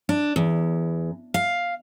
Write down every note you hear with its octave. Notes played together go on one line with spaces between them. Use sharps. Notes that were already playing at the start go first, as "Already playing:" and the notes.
D4
E2
F5